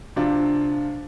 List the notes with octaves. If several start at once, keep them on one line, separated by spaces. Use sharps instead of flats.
C3 F3 D4 F4